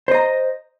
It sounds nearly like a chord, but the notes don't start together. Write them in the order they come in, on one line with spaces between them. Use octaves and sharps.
C5 D#5 A#5